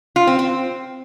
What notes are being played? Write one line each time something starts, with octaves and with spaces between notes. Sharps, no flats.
F4
C4
C4